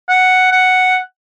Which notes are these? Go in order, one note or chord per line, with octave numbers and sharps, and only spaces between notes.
F#5
F#5